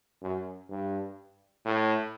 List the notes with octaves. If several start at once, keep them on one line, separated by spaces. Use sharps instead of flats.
F#2
G2
A2